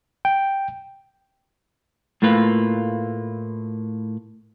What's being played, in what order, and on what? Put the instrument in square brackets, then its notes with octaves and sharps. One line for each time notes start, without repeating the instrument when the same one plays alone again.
[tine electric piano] G5
[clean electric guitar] A2 A3 A#3 F4 B4